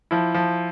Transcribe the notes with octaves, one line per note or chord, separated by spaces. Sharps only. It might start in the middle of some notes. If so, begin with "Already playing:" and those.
F3 E4
F3